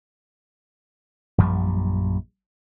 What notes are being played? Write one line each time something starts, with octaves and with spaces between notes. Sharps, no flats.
A#1 F#2 F3 G3